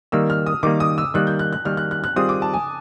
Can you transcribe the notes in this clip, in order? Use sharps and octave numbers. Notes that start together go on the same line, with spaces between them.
D#3 G3 A#3 E6
F6
D#6
D#3 G3 A#3 D6
D#6
E6
D#3 G3 A#3 F#6
G6
F#6
F#6
D#3 G3 A#3 F6
F#6
F#6
F#6
D#3 G3 C4 F4 G#4 D#6
D6
A5
G#5